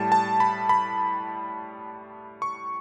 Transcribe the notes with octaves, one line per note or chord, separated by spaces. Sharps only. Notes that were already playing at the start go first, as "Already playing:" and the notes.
Already playing: A2 G3 A5
A5
B5
B5
C#6